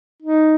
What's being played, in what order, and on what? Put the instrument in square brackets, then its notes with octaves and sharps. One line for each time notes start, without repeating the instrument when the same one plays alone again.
[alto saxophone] D#4